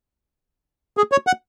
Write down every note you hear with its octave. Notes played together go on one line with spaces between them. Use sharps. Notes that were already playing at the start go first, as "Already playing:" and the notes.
G#4
C#5
F#5